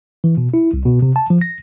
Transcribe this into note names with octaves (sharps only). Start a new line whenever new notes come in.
E3
B2
E4
C2
B2
C3
A5
F3
A#6